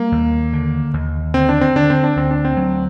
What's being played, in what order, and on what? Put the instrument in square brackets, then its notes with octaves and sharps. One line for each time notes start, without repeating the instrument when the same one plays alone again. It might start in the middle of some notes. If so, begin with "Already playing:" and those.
Already playing: [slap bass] G3 [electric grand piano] A#3
[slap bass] D#2
D3
D#2
[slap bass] D3 [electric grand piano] C4
[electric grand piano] D4
C4
[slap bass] D3 [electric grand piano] D4
[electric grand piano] C4
D4
[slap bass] D2 [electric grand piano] C4
[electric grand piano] D4
C4
[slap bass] F#3